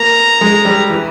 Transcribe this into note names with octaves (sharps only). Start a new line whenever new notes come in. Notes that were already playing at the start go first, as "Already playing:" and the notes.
Already playing: A#3 A#5
G#3
G3
E3